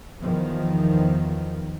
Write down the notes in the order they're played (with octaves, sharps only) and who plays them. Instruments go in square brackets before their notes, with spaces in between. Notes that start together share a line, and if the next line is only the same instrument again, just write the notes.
[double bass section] E2 D#3 F3